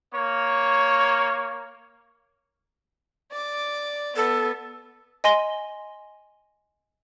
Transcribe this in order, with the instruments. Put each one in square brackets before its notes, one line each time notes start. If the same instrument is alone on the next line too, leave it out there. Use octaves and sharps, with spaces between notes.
[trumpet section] A#3 C#5
[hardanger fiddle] D5 D6
[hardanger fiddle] B3 [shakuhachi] A4
[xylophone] D#5 G#5 C6 A#6 G7